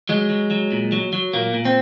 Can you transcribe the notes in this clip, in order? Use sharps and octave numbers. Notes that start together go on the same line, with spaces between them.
F#3 G#3
F#3
F#3
A#2
F#3
F#3
A#2 A#3
A#2
C4